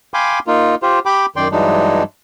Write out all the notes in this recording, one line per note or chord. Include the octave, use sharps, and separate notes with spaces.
F5 G5 G#5 B5 C6 D6
A#3 D#4 F4
F4 G4 C5
G4 G5 B5 D6
F#2 D#3 D5 G5 C6
G2 E3 F#3 G#3 D4 D#4